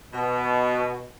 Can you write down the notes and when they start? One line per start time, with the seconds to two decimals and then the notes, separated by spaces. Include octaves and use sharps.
0.13 B2